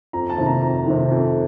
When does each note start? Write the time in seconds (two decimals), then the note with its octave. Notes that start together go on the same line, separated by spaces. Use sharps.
0.13 F2 A#5
0.30 A5
0.38 C3 D#3
0.46 A#5
0.62 F2 A#5
0.87 C3 D#3
1.11 F2